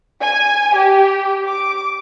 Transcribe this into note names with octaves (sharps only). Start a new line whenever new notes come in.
G#5
G4
D6